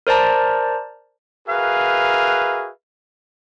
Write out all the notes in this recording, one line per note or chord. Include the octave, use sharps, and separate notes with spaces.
A#4 C5 D5 A5 A#5
F#4 G#4 A#4 B4 E5 F5